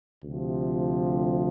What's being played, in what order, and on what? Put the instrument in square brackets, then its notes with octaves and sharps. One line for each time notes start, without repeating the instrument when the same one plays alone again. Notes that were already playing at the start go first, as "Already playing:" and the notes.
[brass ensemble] D2 C3 F3